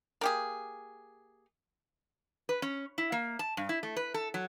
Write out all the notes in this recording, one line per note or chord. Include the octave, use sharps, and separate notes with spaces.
A#3 G4 G#4
B4
C#4
E4
A#3
A5
G2
E4
A3
B4
A4
F#3